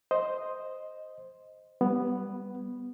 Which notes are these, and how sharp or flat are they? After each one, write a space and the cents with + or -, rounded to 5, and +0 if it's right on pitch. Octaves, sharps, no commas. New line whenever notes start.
C5 +0 D#5 +0
G3 +0 B3 +0